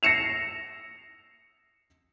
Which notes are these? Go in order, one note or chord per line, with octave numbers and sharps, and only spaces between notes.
A#6 C7 C#7 E7 F7